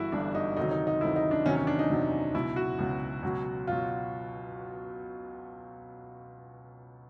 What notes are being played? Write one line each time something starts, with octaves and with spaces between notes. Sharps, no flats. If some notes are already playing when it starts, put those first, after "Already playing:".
Already playing: G1 G2 E3 E4 F#4
G1 G2 E3 D4
D#4
D2 C3 D#3 F#3 D#4
D#4
D#4
D2 C3 D#3 F#3 E4
D#4
D4
E2 C3 D#3 F#3 C#4
C#4
D4
D#4
E2 C3 D#3 F#3
C#2 B2 F#3 E4
F#4
C#2 B2 F#3
C#2 B2 F#3
B2 F#3 F4